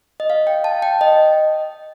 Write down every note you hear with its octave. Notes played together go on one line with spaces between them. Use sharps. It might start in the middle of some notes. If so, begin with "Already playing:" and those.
D#5
F5
G5
A5
G5
D#5